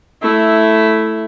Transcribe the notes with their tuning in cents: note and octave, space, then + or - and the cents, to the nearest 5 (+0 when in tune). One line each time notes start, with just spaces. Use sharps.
A3 +0 E4 +0